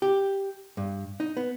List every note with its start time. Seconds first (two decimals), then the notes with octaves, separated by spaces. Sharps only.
0.02 G4
0.77 G2
1.20 D#4
1.37 B3